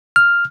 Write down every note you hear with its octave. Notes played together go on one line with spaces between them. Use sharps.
F6